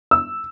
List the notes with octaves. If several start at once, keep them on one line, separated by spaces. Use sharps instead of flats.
E6